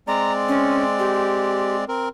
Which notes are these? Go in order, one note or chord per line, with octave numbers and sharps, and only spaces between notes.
G#3 C4 D5 A#5
C#4
G4
C4 A#4